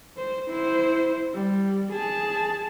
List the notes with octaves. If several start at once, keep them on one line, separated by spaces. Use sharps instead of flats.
C5
E4 C5
G3
G#4 A5